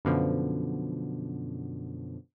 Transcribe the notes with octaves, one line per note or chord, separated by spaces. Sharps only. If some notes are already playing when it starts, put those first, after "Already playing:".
F#2 B2 D3 F3